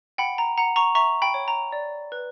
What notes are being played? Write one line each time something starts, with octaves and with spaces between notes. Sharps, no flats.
F#5 G5 B5
A#5
F#5 A#5
A#5 C#6
E5 A#5 C#6
G5 B5
C#5
A#5
D5
B4